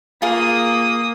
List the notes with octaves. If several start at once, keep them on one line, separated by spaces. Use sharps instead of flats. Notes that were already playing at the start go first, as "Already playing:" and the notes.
A#3 F4 G#4 A#4 D#6